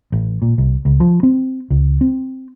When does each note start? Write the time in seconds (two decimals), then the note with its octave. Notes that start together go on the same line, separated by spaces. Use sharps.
0.12 A1
0.42 A#2
0.58 C2
0.85 C#2
1.00 F3
1.23 C4
1.70 C#2
2.01 C4